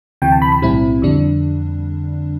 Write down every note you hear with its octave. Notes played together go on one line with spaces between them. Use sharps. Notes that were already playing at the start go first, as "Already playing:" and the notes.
D2 C3 E3 G5
A5
B5
B5
B1 A2 G3 C4 E4
F2 D3 G3 D4